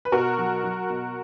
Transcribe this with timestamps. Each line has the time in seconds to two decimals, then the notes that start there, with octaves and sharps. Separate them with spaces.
0.05 B4
0.12 B2 F#4 A#4
0.38 F#3
0.64 F#3
0.90 B2